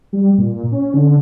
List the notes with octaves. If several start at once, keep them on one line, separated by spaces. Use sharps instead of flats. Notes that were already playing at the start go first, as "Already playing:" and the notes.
G3
A#2
C#4
D3